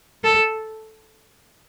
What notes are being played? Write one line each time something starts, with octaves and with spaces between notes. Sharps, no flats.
A4